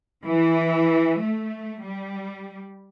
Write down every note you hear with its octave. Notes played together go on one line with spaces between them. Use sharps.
E3
A3
G3